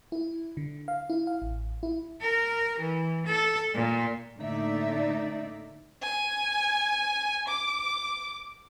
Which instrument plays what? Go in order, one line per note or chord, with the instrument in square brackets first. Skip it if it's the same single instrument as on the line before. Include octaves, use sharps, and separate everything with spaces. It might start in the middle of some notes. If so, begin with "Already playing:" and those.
[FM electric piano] E4
D3
F5
E4
F5
A1
E4
[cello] A#4
E3
A4
A#2
[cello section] A2 D3 A#3 D#4 D5 E5
[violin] G#5
D6